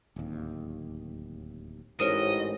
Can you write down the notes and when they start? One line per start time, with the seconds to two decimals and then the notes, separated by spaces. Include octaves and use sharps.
0.16 D1 D#2
2.00 A1 G#2 A#4 C5 C#5 D#5